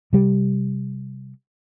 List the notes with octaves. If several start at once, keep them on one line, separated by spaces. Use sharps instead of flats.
C3 G3